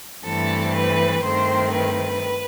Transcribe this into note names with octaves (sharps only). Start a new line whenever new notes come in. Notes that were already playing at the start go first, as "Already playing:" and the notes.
G2 E3 A3 C4 A4
B4
G2 D#3 A3 C4 C5
B4